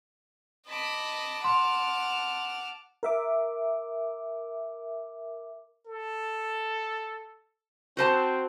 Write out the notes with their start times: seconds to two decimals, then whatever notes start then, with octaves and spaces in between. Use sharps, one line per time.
0.68 D#5 A5 B5 D6
1.44 F#5 C6 F6
3.03 A#4 E5 D6
5.86 A4
7.97 C4 F#4 C5 A5